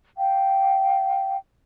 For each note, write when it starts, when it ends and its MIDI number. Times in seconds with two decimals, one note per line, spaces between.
0.17 1.36 77
0.17 1.36 79